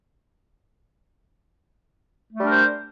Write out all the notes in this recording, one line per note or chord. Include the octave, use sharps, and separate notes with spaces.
G3 A3 D4 A#4 C5